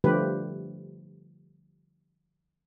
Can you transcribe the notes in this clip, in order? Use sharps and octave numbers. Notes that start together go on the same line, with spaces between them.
D3 F3 G3 A3 G4 B4